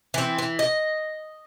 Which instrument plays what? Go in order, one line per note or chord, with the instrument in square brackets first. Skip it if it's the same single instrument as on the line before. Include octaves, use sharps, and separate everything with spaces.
[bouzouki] E3 C4
E3
D#5